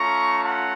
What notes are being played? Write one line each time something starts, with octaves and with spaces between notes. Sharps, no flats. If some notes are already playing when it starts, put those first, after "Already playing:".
Already playing: A3 C#4 F4 A#5 C#6
F#5 A#5